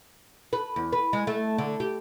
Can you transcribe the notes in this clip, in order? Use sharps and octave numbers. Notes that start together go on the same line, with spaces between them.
B4
E2
B4
G#3
A3
D3
G4